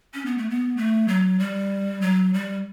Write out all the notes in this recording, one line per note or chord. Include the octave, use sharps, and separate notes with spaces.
C#4
B3
A3
B3
A3
F#3
G3
F#3
G3